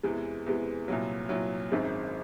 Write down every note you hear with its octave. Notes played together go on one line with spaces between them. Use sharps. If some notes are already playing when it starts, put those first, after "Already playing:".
E2 C3 E3 G#3
E2 C3 E3 G#3
C2 A#2 F#3
C2 A#2 F#3
G#1 F#2 D#3 G#3 C4